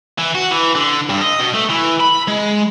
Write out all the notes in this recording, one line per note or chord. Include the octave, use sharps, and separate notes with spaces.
E3
F#4
E3
D3
G2
D#5
B2
A3
E3
B5
G#3